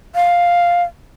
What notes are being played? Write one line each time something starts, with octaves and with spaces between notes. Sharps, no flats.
F5